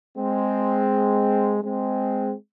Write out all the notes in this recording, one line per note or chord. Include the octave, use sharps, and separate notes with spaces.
G#3 C4
G#3 C4